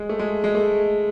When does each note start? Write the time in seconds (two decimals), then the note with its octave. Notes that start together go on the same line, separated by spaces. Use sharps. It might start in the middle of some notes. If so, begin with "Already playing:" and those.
Already playing: G#3
0.09 A3
0.19 G#3
0.44 G#3
0.55 A3